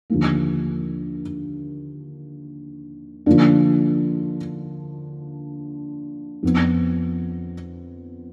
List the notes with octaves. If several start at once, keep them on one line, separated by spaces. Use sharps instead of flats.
D#2 D3 F3 A#3
D3 F3 A#3 D4
F2 F3 B3